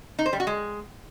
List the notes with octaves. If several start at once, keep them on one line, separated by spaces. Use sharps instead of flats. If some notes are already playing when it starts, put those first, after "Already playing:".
D#4
C5
G3
F#4
G#3